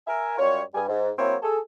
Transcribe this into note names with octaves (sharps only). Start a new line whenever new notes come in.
A#4 E5 G#5
F#2 G3 F4 C#5
G2 G3 G#5
G#2
F#3 A#3 C4 E4 C5 C#5
G#4 A4